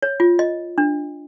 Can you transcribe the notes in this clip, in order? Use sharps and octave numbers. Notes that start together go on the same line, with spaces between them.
C#5
F4
D#5
D4